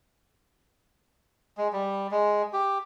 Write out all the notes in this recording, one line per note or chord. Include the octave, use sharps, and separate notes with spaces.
G#3
G3
G#3
G4